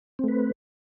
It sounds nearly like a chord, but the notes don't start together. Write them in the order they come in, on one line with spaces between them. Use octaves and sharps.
C4 A3 B4